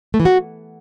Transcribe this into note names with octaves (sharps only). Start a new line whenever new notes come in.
A3
E3
F#4